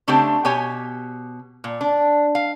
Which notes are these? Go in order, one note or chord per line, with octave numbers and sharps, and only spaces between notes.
C#3 A3 C4 D4 G4 C5
B2 G4 C#5 G#5
A#2
D4
F5